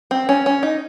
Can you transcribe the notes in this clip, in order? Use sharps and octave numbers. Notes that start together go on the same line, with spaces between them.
C4
C#4
C#4
D#4